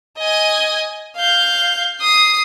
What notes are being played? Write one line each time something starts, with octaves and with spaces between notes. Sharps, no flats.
D#5 G#5
F5 G6
D#6 C7